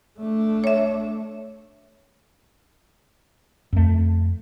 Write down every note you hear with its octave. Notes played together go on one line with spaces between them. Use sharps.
A3 D4
C#5 E5
F2 A3